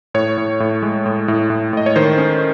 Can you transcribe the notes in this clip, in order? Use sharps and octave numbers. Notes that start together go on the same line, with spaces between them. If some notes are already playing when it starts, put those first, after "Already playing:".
A2 C#5
A2
A2
G#3
A2
A2
A2
A2 D#5
C#5
D#3 C5
C#4